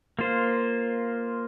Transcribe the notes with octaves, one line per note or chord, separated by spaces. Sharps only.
A#3 F4 C5